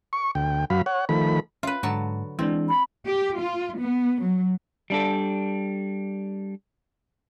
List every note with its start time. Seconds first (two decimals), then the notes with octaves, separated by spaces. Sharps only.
0.13 C#6
0.35 D2 G5
0.70 F#2 F#3 F5 B5
0.86 C#5 F#5
1.09 D#3 F3 A3 B5
1.63 C#4 F4 B4
1.83 G#2 D3 F#3 A5
2.39 E3 G#3 C4 D4
2.69 B5
3.05 G4
3.39 F4
3.79 B3
4.22 F#3
4.90 G3 D4 A4